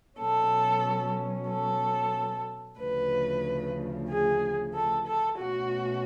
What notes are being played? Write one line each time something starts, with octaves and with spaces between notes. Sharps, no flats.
B2 F#3 C#4 A4
A4
D2 C#3 F3 B4
G#4
A4
A4
B2 A3 C#4 F#4